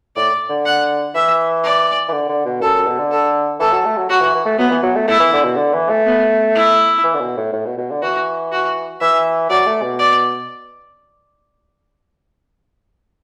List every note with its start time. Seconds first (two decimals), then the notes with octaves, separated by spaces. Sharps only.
0.16 A2 D5
0.49 D3
0.66 F#5
1.15 E3 E5
1.64 D5
2.09 E3
2.12 D3
2.29 D3
2.45 B2
2.61 F#2 A4
2.74 F#2
2.87 B2
2.99 D3
3.11 A4
3.60 E3 A4
3.72 F#3
3.85 A3
3.97 F#3
4.10 F#3 F#4
4.21 E3
4.34 E3
4.46 A3
4.58 F#3 B3
4.71 E3
4.83 F#3
4.96 A3
5.08 A3 E4
5.20 E3
5.33 D3
5.45 B2
5.57 D3
5.73 E3
5.90 A3
6.06 B3
6.55 E4
7.04 E3
7.14 D3
7.21 B2
7.37 A2
7.53 A2
7.66 B2
7.78 B2
7.91 D3
8.02 E3 F#4
8.52 F#4
9.01 E3 E5
9.50 F#3 D5
9.66 A3
9.83 B2
9.99 D5